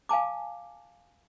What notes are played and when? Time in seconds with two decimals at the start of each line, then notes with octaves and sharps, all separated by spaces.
0.09 F5 G#5 A5 D6